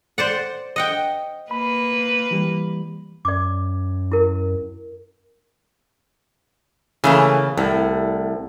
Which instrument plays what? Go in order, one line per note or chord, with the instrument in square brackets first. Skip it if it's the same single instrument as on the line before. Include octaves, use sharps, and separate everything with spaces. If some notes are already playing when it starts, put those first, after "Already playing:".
[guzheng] C5 D5 F#5
D#5 F#5 G5
[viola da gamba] A#3 B4 [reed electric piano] B5
[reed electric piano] E3 G3
[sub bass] F#2 [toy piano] D5 D6
[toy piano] E4 A#4
[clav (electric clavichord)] C#3 [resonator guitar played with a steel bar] E3 A3 A#3
[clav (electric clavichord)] C2 [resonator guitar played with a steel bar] A2